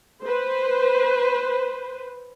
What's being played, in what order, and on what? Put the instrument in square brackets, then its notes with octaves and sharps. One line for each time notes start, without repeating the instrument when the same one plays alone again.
[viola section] B4 C5